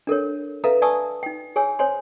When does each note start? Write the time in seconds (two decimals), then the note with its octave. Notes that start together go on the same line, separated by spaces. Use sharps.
0.07 D4 A4 A#4 C#5
0.64 A4 B4 E5 F5 A#5
0.82 D5 G#5 A5 C#6 D#6 E6
1.23 D#4 G5
1.56 G#4 C#5 G#5 E6
1.79 C5 C#5 G#5 C6